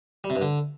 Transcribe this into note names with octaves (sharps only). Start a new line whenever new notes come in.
G3
C3
G2
D3